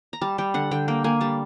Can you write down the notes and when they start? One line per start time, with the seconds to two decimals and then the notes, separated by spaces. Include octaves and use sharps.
0.13 A#5
0.21 G3 A5
0.38 G3 G5
0.54 D3 F#5
0.71 D3 G5
0.88 A#3 G5
1.04 A#3 G#5
1.21 G3 A5